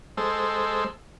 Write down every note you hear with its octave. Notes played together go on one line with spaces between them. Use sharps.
G#3 A4 C5 E6